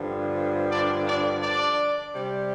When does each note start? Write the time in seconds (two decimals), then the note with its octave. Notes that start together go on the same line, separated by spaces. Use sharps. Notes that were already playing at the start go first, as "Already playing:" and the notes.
Already playing: G2 D3 F3
0.71 D4 D5
1.06 D4 D5
1.42 D4 D5
2.14 C3 G3